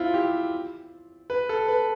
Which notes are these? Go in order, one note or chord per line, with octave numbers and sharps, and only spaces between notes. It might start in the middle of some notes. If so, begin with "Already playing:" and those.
Already playing: C4 E4 F4
G4
B4
A4
B4